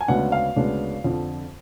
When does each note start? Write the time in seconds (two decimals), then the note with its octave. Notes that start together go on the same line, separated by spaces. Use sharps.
0.01 G#5
0.08 D2 C#3 G#3 B3 D4 F#5
0.32 F5
0.56 D2 C#3 G#3 B3 D4
1.04 F2 D3 F3